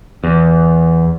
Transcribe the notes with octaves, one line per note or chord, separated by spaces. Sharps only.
E2